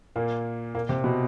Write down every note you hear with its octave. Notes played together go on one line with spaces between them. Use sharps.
A#2 A#3
A#2 A#3
C3 C4
B2 B3